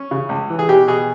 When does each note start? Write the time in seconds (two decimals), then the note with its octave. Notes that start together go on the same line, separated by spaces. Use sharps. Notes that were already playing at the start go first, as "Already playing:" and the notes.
Already playing: C#4
0.11 C#3
0.29 C#2
0.50 E3
0.59 G#4
0.68 B2 G4
0.88 B2 G#4